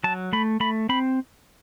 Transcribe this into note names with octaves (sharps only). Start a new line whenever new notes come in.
F#3 A5
A3 B5
A3 B5
C4 B5